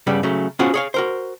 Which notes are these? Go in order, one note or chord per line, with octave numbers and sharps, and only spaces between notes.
G2 C#3 G3 B3
C#3 F#3 A3
B3 C#4 F4 F#4 G#4 C5
G#4 C#5 F5
F#4 A#4 C5